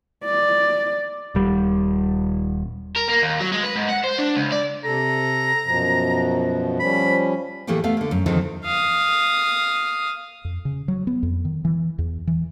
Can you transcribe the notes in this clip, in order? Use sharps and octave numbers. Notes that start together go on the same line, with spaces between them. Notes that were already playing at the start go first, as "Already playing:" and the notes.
D5
D#1 G3
A#4
A#3
D#2
F#3
G#3
B4
G#2
F#5
C5
D4
C#2
D5
C3 A4 A#5
F#2 B2 F3
F3 G3 C#4 B5
A2 E3 A3 A#3 G4 G#4
A3 B3 F5
D3 A#3
F#2
E2 D3 D#3 F3 G#3 C4
F5 D#6
F2
C#3
F#3
B3
F2
D#3
E3
E2
E3